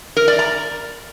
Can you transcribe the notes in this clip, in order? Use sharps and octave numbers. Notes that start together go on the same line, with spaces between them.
A#4
D5
A#5